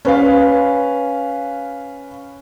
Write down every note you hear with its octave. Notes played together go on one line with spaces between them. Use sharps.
C#4 B4 F5